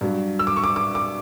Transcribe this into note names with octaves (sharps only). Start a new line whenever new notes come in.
G2 F#3
E6
D6
C#6
D6
D6
D6